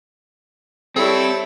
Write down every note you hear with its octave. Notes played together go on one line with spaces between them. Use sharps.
G3 C4 E4 A4 C#5